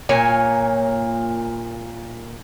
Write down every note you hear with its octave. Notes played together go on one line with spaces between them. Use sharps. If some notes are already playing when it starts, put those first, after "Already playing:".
A#2 A#3 C#5 G#5